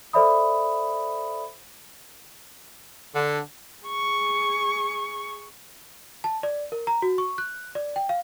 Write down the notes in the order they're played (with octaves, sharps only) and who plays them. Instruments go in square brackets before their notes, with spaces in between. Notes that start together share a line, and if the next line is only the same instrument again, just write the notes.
[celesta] A4 C5 D5 E5 B5 D#6
[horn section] D3
[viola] G#4 C#6
[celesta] A5
D5
A#4
A#5
F#4
C#6
F#6
D5
G5
F5